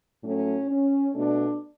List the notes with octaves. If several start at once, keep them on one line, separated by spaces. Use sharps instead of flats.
A2 F#3 A3 C#4
C#4
B2 A3 D4